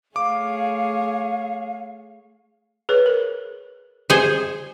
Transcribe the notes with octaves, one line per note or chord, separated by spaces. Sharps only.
A3 G#4 C#5 F5 D6
G#4 B4 C#5
A#4
G4 G#4 C5